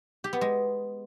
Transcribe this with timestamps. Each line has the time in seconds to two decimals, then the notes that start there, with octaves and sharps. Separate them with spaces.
0.24 G4
0.33 B3
0.41 G#3